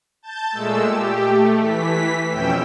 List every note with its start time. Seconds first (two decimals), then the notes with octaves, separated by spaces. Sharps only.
0.22 A5 G6 A6
0.51 A#2 G#3 A3 E6
0.82 G4
1.25 A3
1.59 E3 B6
2.29 F2 B2 C#4 G5 E6